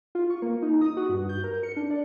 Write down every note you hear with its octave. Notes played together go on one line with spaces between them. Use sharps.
F4
C#6
A#3
D#4
D#6
F#4
G2
G6
A#4
C#7
D4
D5